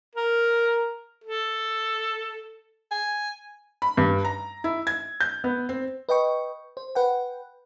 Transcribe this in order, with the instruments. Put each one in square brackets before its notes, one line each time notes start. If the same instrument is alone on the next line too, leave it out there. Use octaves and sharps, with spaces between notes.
[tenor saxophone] A#4
A4
[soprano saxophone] G#5
[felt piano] B5
G2
A#5
E4
G#6
G6
B3
C4
[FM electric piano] B4 D#5 G5 C#6
C5
B4 F#5 G5